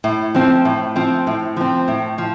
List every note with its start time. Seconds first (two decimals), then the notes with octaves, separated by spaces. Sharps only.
0.04 A2
0.35 F3 C4
0.65 A2
0.96 F3 C4
1.27 A2
1.57 F3 C4
1.88 A2
2.18 F3